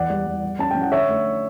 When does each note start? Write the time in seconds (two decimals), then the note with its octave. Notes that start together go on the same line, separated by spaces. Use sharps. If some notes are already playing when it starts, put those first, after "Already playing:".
Already playing: E2 D5 F#5
0.10 G3
0.26 G3
0.43 G3
0.59 C#4 A5
0.71 C#4 G5
0.81 F#5
0.92 D3 C#5 E5
1.09 A3